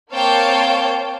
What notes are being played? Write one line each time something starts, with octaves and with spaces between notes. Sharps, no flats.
A#3 C4 C#5 F5 G5 A5